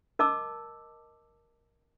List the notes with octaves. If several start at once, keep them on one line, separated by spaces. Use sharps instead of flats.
A#4 D#5 A5 D6 E6